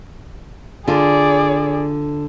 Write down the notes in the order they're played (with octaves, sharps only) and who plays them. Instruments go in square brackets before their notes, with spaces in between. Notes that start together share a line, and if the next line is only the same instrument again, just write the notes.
[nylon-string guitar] D3 F4 [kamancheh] G#4 D5